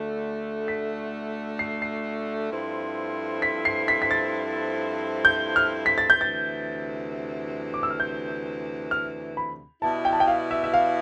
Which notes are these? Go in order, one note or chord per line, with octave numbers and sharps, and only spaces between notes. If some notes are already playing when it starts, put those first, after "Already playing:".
Already playing: D2 D3 A3
B6
C7
C7
G2 F3 C4 E4 A4
B6
C7
B6
B6
A6
G6
F6
B6
A6
G6
D2 C3 E3 A6
D6
E6
F6
G6
F6
B5
B2 G3 B3 E4 A5
G5
A5
G5
F5
E5
E5
F5